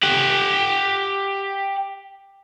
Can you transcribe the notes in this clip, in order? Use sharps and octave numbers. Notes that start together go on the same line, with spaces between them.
G4 F#5